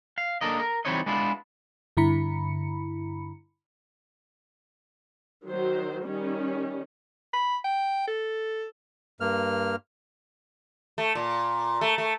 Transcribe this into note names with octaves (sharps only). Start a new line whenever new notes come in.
F5
A#3 B3 D4 A4 A#4 D#5
A#4
E3 G3 C4 D#4 C#5 D#5
G#3 B3 D4 E4 F4
G2 D3 E4 A#5 B5 C#7
D#3 F#3 C5
D#3 G3 C#4
B5
G5
A4
G2 A#3 F6
A3
A#2
A3
A3